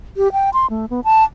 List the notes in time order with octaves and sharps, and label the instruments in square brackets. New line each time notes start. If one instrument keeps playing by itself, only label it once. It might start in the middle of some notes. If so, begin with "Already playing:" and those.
[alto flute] G4
G5
C6
A3
B3
A5